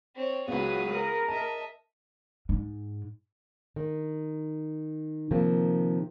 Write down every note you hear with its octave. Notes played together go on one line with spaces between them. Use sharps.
C4 C#5
C#2 F#3 B3 G#4 B4
A#4
D#5 E5 A5
G#2
D#3
C3 D#3 F3 A#3